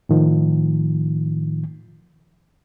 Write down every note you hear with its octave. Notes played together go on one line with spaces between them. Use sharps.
A2 D#3 F3